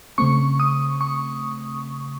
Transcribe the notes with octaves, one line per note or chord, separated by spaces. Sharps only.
C#3 A3 C4 C#6
D#6
C#6